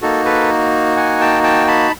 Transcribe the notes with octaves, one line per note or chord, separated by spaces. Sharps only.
A#3 D#4 F#4 A4
A4 B4
F#5 G#5
G5 A5
G5 A5
A5 B5